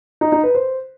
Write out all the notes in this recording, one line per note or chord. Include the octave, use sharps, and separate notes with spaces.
D#4
D#4
B4
C5